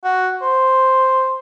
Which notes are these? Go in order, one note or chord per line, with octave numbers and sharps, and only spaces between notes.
F#4
C5